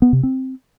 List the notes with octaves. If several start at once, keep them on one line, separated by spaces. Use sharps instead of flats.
B3
C3
C4